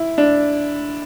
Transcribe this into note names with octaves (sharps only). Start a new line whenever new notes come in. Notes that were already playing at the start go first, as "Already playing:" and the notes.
Already playing: E4
D4